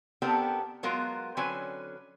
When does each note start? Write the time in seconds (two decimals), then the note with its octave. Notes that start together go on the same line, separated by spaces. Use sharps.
0.22 B3 C4 D4 G4 A4 A#4
0.83 F#3 G#3 B3 F4 F#4 A#4
1.37 D3 F#3 C4 C#4 B4 G#5